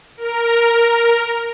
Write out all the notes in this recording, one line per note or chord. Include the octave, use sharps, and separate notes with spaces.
A#4